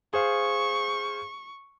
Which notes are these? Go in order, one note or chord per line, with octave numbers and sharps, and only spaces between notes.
G#4 C5 F5 C#6